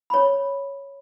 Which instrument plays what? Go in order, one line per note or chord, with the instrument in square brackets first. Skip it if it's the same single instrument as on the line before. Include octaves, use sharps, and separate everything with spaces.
[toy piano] C#5 B5